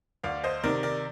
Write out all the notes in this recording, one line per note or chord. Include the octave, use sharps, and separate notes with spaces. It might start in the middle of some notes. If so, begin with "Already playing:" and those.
D2 D5 F5
C5 D#5
C3 D#3 A#4 D5
A#4 D5